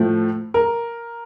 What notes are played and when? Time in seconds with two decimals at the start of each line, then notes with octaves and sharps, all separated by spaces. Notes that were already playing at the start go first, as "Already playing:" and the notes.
Already playing: A2 F3 A3
0.54 A#4